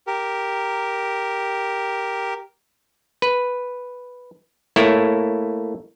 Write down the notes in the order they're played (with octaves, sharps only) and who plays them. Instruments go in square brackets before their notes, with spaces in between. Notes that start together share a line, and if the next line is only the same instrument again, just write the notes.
[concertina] G4 A#4
[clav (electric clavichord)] B4
A3 A#3 E4 C#5